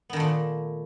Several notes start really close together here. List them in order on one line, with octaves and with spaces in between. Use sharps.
B3 D#3 A3 A#2